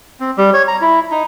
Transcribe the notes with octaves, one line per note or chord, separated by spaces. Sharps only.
C4
G3
C#5
A#5
E4
D#4